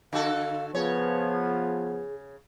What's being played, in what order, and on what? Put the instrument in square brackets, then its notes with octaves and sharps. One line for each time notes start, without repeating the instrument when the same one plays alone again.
[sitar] D3 F#4 A4 [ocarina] F5
[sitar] C#3 C#5 [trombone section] F3 B3 [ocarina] G#4